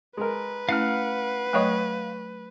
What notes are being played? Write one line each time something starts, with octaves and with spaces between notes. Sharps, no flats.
G#3 A#4 B4
A3 C#4 E4 F5 F#5 F6
F#3 A3 C#5 D#5 G5